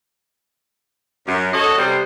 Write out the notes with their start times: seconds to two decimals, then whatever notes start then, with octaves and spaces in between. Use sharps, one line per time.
1.26 F#2
1.53 F#4 A4 C#5 D#5
1.77 C3 G3 B3 C5